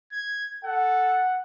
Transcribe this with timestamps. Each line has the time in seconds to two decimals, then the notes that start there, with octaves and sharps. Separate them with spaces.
0.12 G#6
0.64 A4 F#5